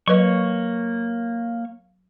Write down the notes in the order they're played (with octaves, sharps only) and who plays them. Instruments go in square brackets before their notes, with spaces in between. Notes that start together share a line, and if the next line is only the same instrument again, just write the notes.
[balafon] F#3 B4 D#5 [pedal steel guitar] A#3 C#5 C#6